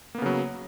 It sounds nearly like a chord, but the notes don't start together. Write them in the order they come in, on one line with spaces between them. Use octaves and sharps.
A#3 B3 C#3 F#3